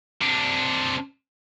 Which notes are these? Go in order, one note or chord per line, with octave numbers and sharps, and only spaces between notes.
C3 D4